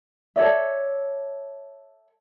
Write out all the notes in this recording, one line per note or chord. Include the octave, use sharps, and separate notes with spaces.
A4 C#5 D5 E5